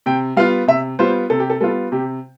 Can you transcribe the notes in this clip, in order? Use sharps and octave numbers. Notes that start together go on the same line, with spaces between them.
C3 G5
G3 B3 F4 F5
C3 E5
G3 B3 F4 C5
C3 A4
G4
A4
G3 B3 F4 A4
C3 G4